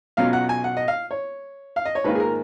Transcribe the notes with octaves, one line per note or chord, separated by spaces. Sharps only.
B1 B2 F#3 C#4 F4 F5
F#5
G#5
F#5
D#5
F5
C#5
F5
D#5
C#5
G#2 D#3 A#3 F4 B4
G#4
A#4